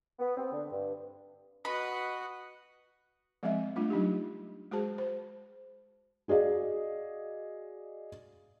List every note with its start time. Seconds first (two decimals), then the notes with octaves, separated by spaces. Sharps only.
0.19 B3
0.36 C4
0.52 D3
0.71 G2
1.65 F#4 B4 D#5 F#5 B5
3.43 F3 G#3 B3 C4 D#5 E5
3.76 G3 A3 D4 F4
3.90 F#3 D4 D#4 G4
4.71 G#3 F#4 G#4 C5 A5
4.98 C5
6.28 F#4 G#4 D5 D#5 F5